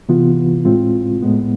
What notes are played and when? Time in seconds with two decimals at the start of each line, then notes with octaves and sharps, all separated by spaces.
0.09 C3 E3 B3 F4
0.65 A2 G#3 C4 F4
1.22 A2 G#3 B3